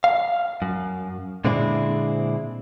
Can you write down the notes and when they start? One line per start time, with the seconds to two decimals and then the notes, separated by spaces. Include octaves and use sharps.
0.04 F5
0.62 F#2
1.45 A#2 D3 G#3 C4 D4 E4